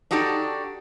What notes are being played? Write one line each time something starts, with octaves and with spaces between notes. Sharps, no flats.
D4 D#4 F#4 G4 A4